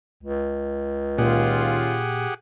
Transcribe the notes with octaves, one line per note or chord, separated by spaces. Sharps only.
C#2
A#2 D#3 C#4 F4 G4 G#4 F#5